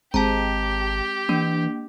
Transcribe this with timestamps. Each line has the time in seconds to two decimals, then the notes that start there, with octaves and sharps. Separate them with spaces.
0.14 G#1 G#3 C4 G4 A5 A#5
1.29 E3 A#3 D4